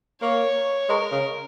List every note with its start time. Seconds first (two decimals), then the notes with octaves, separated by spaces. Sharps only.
0.22 A#3 C#5
0.89 G#3 A#4
1.12 C#3